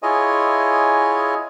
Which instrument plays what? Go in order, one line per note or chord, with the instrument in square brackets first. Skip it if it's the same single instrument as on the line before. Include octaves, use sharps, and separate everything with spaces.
[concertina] E4 F4 G#4 C#5 D#5 G#5